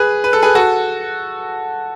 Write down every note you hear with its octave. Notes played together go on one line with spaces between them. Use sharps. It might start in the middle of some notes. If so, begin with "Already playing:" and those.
Already playing: G#4 B4
B4
A4
G#4 B4
F#4 A4